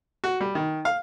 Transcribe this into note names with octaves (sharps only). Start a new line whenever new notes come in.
F#4
G3
D#3
F5